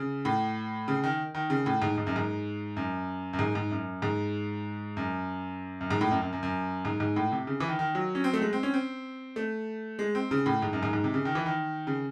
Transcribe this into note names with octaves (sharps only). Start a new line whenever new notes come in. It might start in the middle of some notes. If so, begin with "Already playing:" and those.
Already playing: C#3
A2
C#3
D#3
D#3
C#3
A2
G#2
G#2
F#2
G#2
F#2
F#2
G#2
G#2
F#2
G#2
F#2
F#2
G#2
A2
F#2
F#2
F#2
F#2
G#2
G#2
A2
C3
C#3
E3
D#3
D#3
F#3
C#4
C4
A3
G#3
C4
C#4
C4
A3
G#3
C4
C#3
A2
G#2
F#2
G#2
G#2
C3
C#3
D#3
E3
D#3
C#3